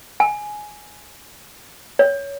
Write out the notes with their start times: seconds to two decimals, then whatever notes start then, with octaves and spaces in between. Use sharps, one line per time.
0.20 G#5
1.99 C#5